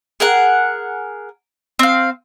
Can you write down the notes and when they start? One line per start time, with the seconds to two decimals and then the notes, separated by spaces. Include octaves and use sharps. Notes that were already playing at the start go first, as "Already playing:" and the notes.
0.20 G#4 A#4 F#5
1.79 C4 F5